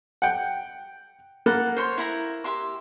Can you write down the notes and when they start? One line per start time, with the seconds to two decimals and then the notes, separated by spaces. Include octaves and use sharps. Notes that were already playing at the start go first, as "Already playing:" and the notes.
0.22 F#5 G5
1.46 A#3 A4 F#5 B5
1.77 C5 C#5 C6
1.98 E4 E5 A#5
2.44 G4 E5 C6